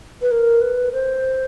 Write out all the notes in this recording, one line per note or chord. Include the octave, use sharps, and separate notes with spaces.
B4
A#4
B4
C5